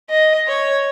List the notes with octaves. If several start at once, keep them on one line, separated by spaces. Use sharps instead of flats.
D#5
C#5